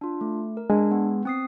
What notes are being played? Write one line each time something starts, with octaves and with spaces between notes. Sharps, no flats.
D4 F4
A3
A#4
G#3 D4
B3
C4 D#6 C7